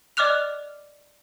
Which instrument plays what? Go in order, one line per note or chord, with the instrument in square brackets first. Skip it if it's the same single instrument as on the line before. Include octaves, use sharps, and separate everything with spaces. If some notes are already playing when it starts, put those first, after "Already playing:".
[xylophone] D5 D#5 D6 F6 F#6 F7